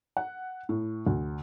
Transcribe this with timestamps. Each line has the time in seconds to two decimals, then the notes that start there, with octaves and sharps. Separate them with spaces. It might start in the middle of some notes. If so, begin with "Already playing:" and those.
0.17 F#5
0.69 A2
1.07 D2